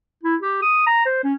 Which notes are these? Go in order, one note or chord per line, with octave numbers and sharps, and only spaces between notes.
E4
G4
D#6
A#5
C5
C#4